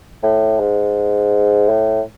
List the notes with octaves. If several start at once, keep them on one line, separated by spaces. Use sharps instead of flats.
A2
G#2
A2